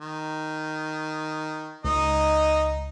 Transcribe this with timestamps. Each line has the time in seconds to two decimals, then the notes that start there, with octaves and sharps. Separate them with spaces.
0.01 D#3
1.85 C#2 D#4 D#5